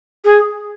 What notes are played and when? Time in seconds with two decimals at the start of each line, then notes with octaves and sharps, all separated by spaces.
0.24 G#4